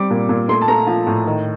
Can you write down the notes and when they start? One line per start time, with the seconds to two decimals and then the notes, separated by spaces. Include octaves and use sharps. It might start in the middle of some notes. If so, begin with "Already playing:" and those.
Already playing: G3 C4 D6
0.10 A#2
0.29 A#2
0.48 A3 C6
0.61 A5
0.68 A3 A#5
0.87 F3
1.07 A2
1.26 D#3